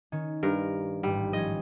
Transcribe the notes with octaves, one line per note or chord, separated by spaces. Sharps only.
D#3 C#4
G2 A#4
A1 G#2 G3
F3 C#4 D#5